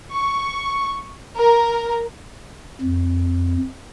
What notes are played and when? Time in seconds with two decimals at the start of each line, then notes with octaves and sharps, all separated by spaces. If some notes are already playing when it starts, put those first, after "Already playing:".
0.11 C#6
1.37 A#4
2.82 F2